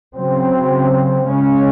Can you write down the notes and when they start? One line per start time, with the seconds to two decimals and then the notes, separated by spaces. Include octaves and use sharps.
0.16 C#3 F#3 C4
1.27 C#3 G#3 C#4